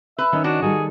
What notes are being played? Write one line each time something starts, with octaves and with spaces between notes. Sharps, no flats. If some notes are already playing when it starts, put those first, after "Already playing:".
B4 E5
D#3 C#4 D#5
D4 F#4
D#3 G3 G#4 A4